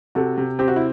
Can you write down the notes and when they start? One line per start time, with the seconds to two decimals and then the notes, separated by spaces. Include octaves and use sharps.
0.15 C3 F#4 A4
0.37 C3
0.59 C4 G4
0.68 F#4
0.76 E4